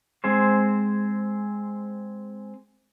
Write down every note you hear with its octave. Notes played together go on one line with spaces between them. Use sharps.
G#3 C4 G#4 C5